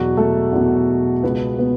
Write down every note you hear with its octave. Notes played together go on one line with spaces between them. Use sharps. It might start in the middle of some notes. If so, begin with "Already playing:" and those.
Already playing: E2 B2 F#3 F#4
A3 A4
E2 B2
C#2 B2 B3 B4
B3 B4